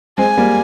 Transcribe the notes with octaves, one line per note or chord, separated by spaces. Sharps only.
G#3 C4 G#5
G3 A#3